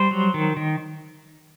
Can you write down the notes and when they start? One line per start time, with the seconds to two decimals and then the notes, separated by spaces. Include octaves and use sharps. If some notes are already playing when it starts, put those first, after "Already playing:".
Already playing: G3 C5
0.11 F#3
0.34 D#3
0.57 D#3